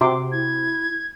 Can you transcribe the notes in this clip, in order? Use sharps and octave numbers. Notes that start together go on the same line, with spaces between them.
C3 F#4 C6 D6
E4 G#6